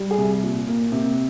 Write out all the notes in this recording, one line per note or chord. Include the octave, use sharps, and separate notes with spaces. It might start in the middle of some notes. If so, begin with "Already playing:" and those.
Already playing: G3
G#4
C2
A#2
A#3
C3